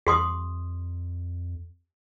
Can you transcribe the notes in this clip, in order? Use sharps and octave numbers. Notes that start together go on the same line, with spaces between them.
F2 G4 C6 D#6